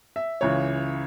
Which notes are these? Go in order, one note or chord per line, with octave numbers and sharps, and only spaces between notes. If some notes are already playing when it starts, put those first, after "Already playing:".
E5
C#2 C#3 E3 C#5